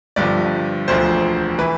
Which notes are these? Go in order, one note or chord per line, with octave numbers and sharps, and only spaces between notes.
G1 G2 D3 F3 D5
E1 D2 D3 F3 C5
E3 B4